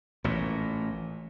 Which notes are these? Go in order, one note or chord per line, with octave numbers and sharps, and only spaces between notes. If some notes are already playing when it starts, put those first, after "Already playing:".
A1 A#2